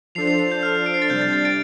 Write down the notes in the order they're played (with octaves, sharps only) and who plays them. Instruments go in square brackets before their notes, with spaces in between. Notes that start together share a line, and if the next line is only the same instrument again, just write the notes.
[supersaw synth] F3 D4 A4 C5 [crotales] C7 F7
[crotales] C7 F7
C7
G6
F6
D7
C7
A6
[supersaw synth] C3 G3 D4 [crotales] G6
[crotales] A6
A6
A6 D7